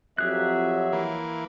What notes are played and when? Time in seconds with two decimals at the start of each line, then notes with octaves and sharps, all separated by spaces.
0.18 F2 F#3 G4 G#4 E5 F#6
0.92 E3 A#3